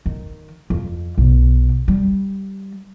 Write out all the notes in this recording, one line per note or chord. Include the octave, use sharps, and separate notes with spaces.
D#3
F2
B1
G3